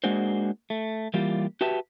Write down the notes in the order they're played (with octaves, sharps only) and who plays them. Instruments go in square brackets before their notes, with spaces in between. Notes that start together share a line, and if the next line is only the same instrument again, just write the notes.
[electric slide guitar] G#3 A#3 D4 F#4 G#4 C5
A3
E3 G3 A#3 F4 G4
F#4 G4 B4 E5 A5